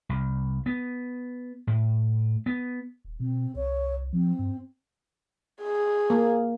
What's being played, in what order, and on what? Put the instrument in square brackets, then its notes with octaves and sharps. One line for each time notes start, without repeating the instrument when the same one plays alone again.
[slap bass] C2
B3
A2
B3
[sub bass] D#1
[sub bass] B2 [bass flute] C4
[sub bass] C2 [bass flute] C#5
[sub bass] F3 [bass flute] C4
[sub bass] G2
[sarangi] G#4
[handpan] A#3